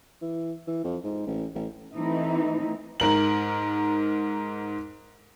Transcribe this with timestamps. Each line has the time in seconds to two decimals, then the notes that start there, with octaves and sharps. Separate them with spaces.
0.21 E3
0.67 E3
0.84 F2
1.04 G#2
1.27 A1
1.55 A1
1.96 E3 A3 C4 D#4 E4
3.00 G#2 A#4 F#7